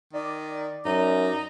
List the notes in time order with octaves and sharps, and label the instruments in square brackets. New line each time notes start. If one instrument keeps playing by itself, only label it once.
[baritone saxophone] D#3 [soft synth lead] D5
[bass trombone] F#2 [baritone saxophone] D#4